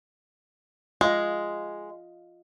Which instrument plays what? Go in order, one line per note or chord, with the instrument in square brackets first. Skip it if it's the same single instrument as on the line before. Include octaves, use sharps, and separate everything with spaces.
[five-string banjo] G#3 [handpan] F4 D#5 F5